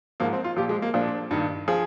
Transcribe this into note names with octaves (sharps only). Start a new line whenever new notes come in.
G#2 F3 A#3
C4
F4
A#2 F3 G4
G#3
A#3
A#2 F3 D4
G2 D#3
F3 G#4